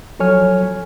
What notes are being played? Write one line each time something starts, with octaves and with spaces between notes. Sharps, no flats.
F3 F#3 A4 C#5 G#5 F6